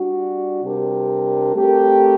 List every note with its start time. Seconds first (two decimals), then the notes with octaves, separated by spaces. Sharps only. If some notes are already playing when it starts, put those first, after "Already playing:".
Already playing: G3 D4 F#4
0.63 C3 G3 D4 G4 A#4
1.54 A3 C4 G4 A#4